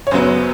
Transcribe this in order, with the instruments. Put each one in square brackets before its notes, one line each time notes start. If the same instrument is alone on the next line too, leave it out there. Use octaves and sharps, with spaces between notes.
[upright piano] C#5
F#2 C#3 F#3 B3 C5